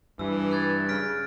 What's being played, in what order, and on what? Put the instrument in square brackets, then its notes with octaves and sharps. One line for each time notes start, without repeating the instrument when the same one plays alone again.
[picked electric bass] G2 [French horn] E3 [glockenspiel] E6
[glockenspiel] F#6 G#6 A6
[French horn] C#3 [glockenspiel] F6 B6 D7